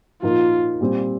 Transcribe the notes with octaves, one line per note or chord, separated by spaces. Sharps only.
A#2 F3 A#3 D#4 F4 A#4
A#2 G3 C4